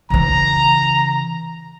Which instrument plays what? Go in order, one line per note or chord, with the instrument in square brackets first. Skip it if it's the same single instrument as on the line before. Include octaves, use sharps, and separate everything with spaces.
[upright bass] C#3 E3 [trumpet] A#5